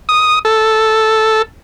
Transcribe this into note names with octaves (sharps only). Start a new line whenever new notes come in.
D#6
A4